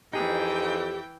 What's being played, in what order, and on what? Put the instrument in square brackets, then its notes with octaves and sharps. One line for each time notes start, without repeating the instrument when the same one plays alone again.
[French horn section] F2 [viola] E3 G5 [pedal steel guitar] D#4 G#4 [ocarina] G4